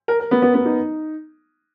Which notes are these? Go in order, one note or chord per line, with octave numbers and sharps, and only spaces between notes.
A#4
A#4
B3
B3
B3
D#4